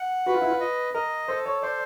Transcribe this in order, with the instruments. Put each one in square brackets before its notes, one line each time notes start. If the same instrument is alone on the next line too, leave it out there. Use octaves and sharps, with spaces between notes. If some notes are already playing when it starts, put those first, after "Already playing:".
Already playing: [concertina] F#5
[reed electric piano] F#4 [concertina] B4
[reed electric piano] F4
E4
F4
[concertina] D#5
[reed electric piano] A#4 [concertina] D#5
[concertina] A4 [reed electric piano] C5
[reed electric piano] C#5
[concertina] C5 [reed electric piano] D5